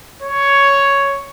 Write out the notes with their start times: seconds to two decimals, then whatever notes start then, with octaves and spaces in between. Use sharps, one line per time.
0.23 C#5